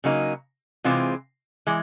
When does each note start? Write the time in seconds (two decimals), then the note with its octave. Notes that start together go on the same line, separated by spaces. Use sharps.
0.04 C#3 F#3 A#3 D#4
0.84 C3 E3 G#3 C4 F4
1.67 E3 G#3